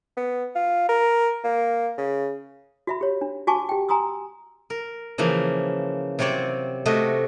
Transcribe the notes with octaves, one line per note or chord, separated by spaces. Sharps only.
B3
F4
A#4
A#3
C#3
F#4 E5 B5
G4 C#5
D4
F#4 G#5 A5 C#6 D6
G4 G5
G#5 A#5 C6 D#6 E6
A#4
C#3 E3 F3 A#3
C3 F#3 C4 C#5 D5
C3 A3 F#4 D#5